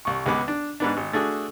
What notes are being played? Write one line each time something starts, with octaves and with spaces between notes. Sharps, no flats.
C2 C#6
C#2 G#3 B3 D6
D4
G#2 B3 D4
G#1
A3 D4 F#4 G#4